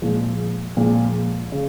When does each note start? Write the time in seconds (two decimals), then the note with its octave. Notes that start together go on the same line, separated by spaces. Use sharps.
0.02 A#2 F3 G#3
0.77 A#2 F3 G#3
1.52 C#3